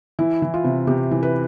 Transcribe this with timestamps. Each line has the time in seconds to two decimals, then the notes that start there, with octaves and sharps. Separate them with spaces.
0.19 E3 E4
0.42 E3
0.54 F4
0.64 C3
0.87 C3 G4
1.11 E3
1.23 B4